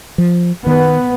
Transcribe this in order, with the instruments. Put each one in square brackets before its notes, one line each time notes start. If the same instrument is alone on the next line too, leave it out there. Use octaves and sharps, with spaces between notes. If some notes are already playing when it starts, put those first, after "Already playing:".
[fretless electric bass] F3
[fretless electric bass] D#3 [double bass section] B3